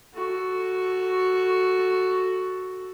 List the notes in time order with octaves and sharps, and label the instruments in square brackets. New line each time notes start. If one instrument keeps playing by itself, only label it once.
[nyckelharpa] F#4 A4